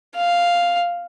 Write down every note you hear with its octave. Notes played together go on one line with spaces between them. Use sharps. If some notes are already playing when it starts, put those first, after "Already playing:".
F5